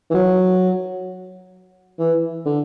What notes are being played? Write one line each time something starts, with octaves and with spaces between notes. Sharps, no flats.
E3
F#3
E3
D3